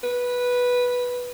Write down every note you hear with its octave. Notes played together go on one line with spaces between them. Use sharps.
B4